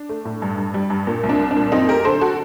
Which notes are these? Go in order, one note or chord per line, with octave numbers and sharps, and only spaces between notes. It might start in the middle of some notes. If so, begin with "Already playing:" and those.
Already playing: D4
A3
A2
G2
G2
G3
G2
A#2
C2
D4
C2
D4
A#2
F#2 C4 D#4
A3 G4 A#4
D3 A4 C5
F#4 A4